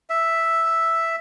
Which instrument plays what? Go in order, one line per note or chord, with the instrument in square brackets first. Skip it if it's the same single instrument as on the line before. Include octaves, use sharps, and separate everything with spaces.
[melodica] E5